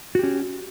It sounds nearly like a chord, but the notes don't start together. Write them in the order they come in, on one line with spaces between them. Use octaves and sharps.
F#4 G4 C#4